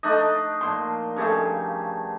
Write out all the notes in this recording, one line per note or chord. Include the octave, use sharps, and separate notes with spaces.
A3 D4 D#4 D#5
A#2 F3 C6
G2 C#3 F3 A3